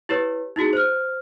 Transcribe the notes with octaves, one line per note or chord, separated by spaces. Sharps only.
E4 G4 B4 C#5
D#4 E4 F#4 G#4
C5 F6